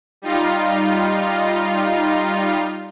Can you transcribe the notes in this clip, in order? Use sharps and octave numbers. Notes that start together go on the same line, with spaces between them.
G3 D#4 F4